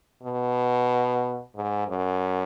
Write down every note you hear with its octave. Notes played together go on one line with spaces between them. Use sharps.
B2
G#2
F#2